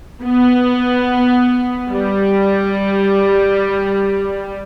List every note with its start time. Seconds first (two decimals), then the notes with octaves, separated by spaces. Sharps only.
0.23 B3
1.90 G3